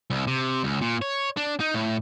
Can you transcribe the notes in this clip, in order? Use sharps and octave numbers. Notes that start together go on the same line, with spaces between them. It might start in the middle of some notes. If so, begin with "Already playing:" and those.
C2
C3
C#2
A#2
C#5
D4
D#4
A2